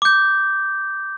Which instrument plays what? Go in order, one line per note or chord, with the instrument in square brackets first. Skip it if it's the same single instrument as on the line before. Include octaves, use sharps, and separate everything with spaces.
[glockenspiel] D6 G6